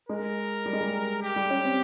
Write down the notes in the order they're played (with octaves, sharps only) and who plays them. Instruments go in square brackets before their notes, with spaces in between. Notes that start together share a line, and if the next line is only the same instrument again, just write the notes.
[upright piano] G#3 [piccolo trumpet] A#4
[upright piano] G3
G#3
G3
[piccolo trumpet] G4
[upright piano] G3
C#4
C4